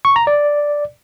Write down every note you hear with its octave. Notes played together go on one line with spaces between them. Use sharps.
C#6
A#5
D5